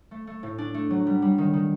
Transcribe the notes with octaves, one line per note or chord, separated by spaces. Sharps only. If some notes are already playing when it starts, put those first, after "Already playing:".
A3
A3
A2
D4
A3
F#3
G3
G3
D#3
D#3